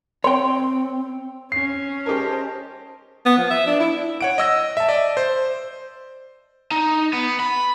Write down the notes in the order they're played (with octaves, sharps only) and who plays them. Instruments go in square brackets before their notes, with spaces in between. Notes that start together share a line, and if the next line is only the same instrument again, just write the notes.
[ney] C4 [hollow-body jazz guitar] C#5 G5 [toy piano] C6
[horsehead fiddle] C#4 [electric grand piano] C7
[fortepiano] G4 G#4 A#4 [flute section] C5 D#5 A5
[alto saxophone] B3
F3
E5
D4
E4
[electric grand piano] C#5 F#5 D7
D#5 E6 A#6
E5 A5
D5 D#5
C5
[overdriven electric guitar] D#4
B3
B5